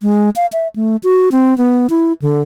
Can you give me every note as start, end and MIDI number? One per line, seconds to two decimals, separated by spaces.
0.02 0.30 56
0.36 0.46 77
0.53 0.68 76
0.76 0.96 57
1.03 1.29 66
1.32 1.57 60
1.58 1.87 59
1.90 2.13 64
2.22 2.42 50